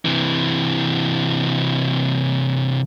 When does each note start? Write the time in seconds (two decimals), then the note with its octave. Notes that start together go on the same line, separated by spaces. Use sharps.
0.05 C3 E3